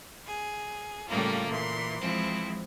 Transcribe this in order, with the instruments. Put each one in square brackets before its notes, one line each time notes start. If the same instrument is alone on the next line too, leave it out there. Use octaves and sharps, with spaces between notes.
[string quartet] G#4
A2 C#3 G3 A3 A#3 F4
A#2 E3 C6
E3 F3 G#3 C4 E4